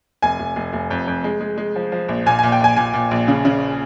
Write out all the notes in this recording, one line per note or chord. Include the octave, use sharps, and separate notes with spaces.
F1 G#5
F1
F1
F1
F2
F2
G#3
G#3
G#3
F3
F3
A#1
A#2 G#5
A#2 G#5
G5
A#1 G#5
A#2 G#5
A#2
A#1
C#3
C#3